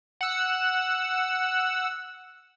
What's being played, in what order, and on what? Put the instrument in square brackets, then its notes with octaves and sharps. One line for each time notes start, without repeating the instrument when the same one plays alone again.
[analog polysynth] F#5 E6